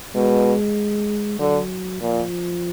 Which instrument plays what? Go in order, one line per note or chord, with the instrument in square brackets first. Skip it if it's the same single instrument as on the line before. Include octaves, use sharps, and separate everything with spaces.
[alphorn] B2 [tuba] G#3
[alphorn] D3 [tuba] F#3
[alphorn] A#2 [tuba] F3